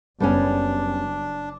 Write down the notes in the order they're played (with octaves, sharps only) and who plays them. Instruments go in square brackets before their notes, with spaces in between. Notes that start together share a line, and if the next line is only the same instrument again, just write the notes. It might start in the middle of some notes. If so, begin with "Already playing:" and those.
[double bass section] F#1 [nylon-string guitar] G3 B3 C#4 [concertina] D4